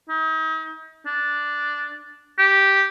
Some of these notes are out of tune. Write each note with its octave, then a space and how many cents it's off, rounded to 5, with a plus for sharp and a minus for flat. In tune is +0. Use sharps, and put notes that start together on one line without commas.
D#4 +40
D4 +0
G4 -5